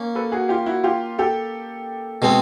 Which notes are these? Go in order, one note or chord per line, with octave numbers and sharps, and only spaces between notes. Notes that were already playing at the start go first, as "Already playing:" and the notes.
Already playing: A#3 C#4
A4 B4
F#4 G#4
F4 G4
E4 F#4
F4 G4
G4 A4
B2 G#3 C4